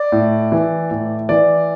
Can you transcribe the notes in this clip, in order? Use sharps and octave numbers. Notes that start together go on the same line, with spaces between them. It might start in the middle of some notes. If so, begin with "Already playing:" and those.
Already playing: D5
A2
E3
A2
E3 D5